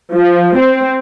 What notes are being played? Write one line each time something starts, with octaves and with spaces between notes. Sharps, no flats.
F3
C4